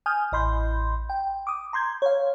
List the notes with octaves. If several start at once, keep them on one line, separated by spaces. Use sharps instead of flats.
G#5 D#6 F6 G6
A1 D#5 B5 C6 G6
G5
D6 D#6
A#5 C6 G6 G#6
C#5 F5